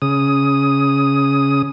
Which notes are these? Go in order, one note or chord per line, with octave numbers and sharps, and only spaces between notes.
C#3 D#6